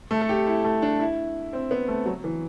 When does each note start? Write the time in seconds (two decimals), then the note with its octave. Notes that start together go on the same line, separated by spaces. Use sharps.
0.11 A3
0.21 A4
0.29 G4
0.47 E4
0.64 A3
0.82 D4
1.00 E4
1.53 C4
1.71 B3
1.88 A3
2.06 F#3
2.24 E3